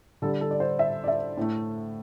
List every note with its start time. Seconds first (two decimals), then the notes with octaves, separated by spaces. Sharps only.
0.22 D3 G3 A4
0.41 A4
0.51 D5
0.60 C5
0.79 E5
1.04 D5
1.08 E5
1.37 A2 A3